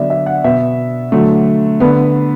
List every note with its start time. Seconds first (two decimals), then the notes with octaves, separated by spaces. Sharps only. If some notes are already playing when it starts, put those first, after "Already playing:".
Already playing: D3 F#3 B3 D5 E5
0.10 E5
0.26 F#5
0.44 B2 B3 E5
1.12 D3 F#3 A3
1.80 D3 B3 B4